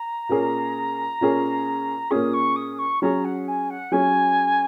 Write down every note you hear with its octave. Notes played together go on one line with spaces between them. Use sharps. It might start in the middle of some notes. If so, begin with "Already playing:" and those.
Already playing: A#5
A#2 A#3 C#4 G#4
A#2 A#3 C#4 G#4
A#2 A#3 C#4 G#4 D#6
C#6
D#6
C#6
F#3 C#4 G#4 A#5
F#5
G#5
F#5
F#3 C#4 G#4 G#5